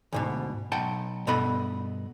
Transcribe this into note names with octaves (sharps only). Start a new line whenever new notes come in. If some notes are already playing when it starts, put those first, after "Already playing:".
D2 G#2 B2
B1 F#5 G5 A5
G2 B2 B3 A4 D#5 B5